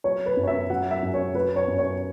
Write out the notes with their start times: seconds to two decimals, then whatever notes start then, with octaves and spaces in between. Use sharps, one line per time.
0.04 F#3 C#5
0.26 B4
0.37 F#2
0.43 C#5
0.48 E5
0.70 F#3 F#5
0.91 E5
1.03 F#2
1.14 C#5
1.34 F#3 B4
1.56 C#5
1.68 F#2
1.78 C#5